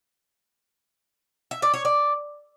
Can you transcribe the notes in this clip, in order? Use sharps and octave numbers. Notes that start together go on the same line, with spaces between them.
E5
D5
C#5
D5